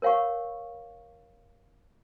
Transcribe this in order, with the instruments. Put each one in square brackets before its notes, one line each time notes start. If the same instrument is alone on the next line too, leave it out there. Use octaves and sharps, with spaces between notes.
[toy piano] A#4 C#5 F5 F#5 C#6